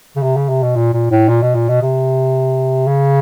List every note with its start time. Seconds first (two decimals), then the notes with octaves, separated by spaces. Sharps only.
0.16 C#3
0.23 C3
0.37 C#3
0.49 C3
0.63 B2
0.76 A#2
0.93 A#2
1.11 A2
1.29 A#2
1.42 B2
1.55 A#2
1.69 B2
1.82 C3
2.88 C#3